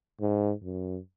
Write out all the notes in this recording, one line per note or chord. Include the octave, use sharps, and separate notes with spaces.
G#2
F#2